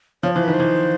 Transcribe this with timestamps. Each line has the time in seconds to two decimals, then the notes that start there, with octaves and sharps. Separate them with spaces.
0.23 F3 C#5
0.34 E3 C5
0.43 D#3 B4
0.54 C5
0.60 E3